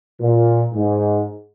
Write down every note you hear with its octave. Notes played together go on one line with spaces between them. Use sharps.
A#2
G#2